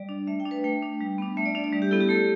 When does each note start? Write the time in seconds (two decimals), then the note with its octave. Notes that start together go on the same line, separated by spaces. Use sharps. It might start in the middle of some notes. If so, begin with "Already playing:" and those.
Already playing: G3 D5
0.09 D4
0.27 A3 E5
0.40 G5
0.45 D4
0.51 B4
0.64 A3 G5
0.83 D4
1.00 G3
1.18 B3 D4
1.37 A3 E5
1.45 D5
1.55 D4 E5
1.64 D5
1.73 G3
1.82 G4
1.91 B3 E4 A4
2.01 G4
2.09 A3 A4